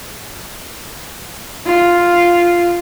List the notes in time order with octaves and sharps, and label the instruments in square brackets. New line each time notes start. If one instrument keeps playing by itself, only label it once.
[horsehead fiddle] F4